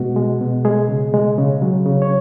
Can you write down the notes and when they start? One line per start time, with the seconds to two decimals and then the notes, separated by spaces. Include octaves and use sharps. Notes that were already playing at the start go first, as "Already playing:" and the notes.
Already playing: B2 G#3 F#4
0.16 G#3
0.41 B2
0.65 G#3 G#4
0.88 C#3
1.14 G#3
1.38 C#3
1.62 F#3
1.86 C#3
2.02 C#5